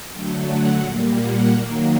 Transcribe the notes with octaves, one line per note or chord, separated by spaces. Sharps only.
D3 F#3 A3 G5
F#5
A#2 G3 A#3
F#5
D#3 F#3 A#3